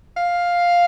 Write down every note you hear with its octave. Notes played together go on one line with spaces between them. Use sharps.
F5